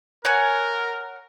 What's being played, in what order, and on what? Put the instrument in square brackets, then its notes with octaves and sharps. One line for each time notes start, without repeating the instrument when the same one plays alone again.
[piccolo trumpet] A#4 [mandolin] C#5 F#5 G#5